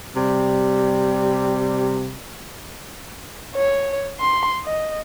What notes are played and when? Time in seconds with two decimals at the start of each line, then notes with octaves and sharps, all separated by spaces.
0.15 C3 G3
3.55 C#5
4.20 C6
4.65 D#5